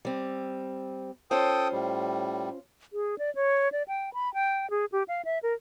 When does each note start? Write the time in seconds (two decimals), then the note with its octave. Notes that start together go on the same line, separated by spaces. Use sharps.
0.05 G3 C4
1.31 C#4 F4 A4 C5 G5 D#6
1.72 A2 G3
2.93 G#4
3.18 D5
3.35 C#5
3.72 D5
3.88 G5
4.14 B5
4.34 G5
4.70 G#4
4.92 G4
5.08 F5
5.25 E5
5.43 A#4